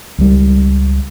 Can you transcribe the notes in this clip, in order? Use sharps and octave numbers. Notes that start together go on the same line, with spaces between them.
C#2 G3